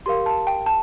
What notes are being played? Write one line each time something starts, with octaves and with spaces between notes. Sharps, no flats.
G4 A#4 F5 C6
A5
G5
A5